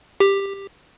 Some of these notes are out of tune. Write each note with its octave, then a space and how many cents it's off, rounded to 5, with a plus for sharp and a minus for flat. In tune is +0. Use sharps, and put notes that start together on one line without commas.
G4 +10